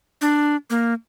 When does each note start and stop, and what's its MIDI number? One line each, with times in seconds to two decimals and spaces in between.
0.21 0.56 62
0.70 0.94 58